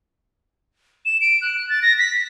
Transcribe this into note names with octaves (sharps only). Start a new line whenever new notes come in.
E7
D7
F#6
A6
A#6
B6